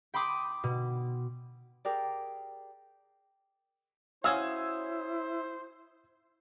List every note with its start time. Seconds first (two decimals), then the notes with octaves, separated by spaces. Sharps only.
0.14 G5 B5 C6 D6 D#6
0.64 B2
1.85 G4 G#4 A#4 D5
4.24 C#4 E4 F#4 C5 F5 D#6 E6 G#6